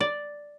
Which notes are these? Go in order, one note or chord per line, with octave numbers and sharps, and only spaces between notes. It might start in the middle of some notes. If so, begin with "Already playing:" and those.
D5